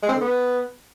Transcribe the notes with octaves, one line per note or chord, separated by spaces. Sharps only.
G#3
C4
D3
B3